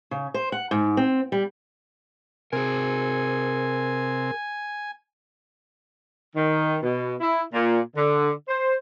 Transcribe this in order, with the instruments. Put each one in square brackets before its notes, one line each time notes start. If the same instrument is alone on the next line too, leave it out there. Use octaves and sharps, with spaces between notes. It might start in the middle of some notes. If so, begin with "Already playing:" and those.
[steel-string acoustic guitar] C#3
C5
F#5
G#2
C4
G3
[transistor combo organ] C3 [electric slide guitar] G#4 A#4 [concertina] G#5
[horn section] D#3
B2
E4
A#2
D3
C5